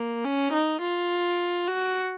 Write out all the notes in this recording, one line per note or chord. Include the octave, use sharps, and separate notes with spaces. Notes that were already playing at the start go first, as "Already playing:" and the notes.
Already playing: A#3
C#4
D#4
F4
F#4